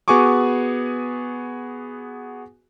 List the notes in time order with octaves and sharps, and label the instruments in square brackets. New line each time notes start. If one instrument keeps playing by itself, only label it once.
[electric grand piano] B3 F#4 G#4 G#5 C#6 D6